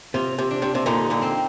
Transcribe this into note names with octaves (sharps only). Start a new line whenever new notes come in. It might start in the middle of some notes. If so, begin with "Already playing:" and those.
C3 F4
C3
D4
C3
C3
A#2 D3 D#4
A#2 D3
C4